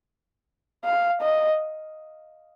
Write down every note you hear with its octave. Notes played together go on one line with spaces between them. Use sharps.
F5
D#5